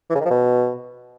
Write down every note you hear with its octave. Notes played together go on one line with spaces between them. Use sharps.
E3
C#3
D#3
F3
B2